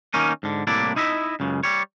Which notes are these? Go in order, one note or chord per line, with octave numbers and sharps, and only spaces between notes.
D#3 A#3 C#4 D#4
G#2 D3
C2 A2 A#3 D4 E4 D5
D#4 E4 D#5 E5
C#2 F#2 C#3
G3 C#5